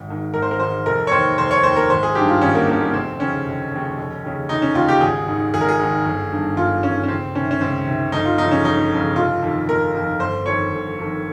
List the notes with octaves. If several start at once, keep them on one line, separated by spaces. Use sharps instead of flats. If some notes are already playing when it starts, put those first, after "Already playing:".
Already playing: G#1
G#2 D#3
G#1 A#4
C5
A#4
G#2 D#3 C5
F1 A#4
C#5
D#2 C5
D#3
F1 C5
C#5
D#2 D#3 C5
A#4
G#1 C5
G#4
G2 D#3 G4
F4
G#1 C#4
A#3
G2 D#3 A#3
A#3
F1 C4
D#2 C#3 C#4
F1
D#2 C#3
F1
D#2 C#3
F1 D#4
C#4
D#2 C#3 F4
G4
G#1 G#4
G#2 D#3
G#1 G#4
A#4
G#4
G#2 D#3
G1
G2 D#3
G1 F4
G2 D#3 C#4
C#4
C#2 C4
C3 D#3 C#4
C#4
C#2 C4
C3 D#3
G1 D#4
F4
F2 D#4
C#3
C#4
G1 D#4
F2 C#3
F1 F4
F2 D#3
F1 A#4
F2 D#3
G1 C5
F2 D#3 C#5
G1
F2 D#3